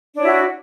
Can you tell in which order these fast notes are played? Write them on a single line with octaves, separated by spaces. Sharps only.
D4 C#5 E4 F#4